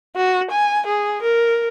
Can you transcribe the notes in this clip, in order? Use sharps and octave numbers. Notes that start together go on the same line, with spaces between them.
F#4
G#5
G#4
A#4